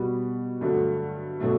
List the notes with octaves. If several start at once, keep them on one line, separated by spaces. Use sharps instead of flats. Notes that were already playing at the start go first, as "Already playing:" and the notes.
Already playing: B2 G3 B3 F#4
G2 D3 F#3 A3
B2 F#3 A3